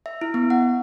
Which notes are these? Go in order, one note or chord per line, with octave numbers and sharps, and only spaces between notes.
E5
E4
B3
F#5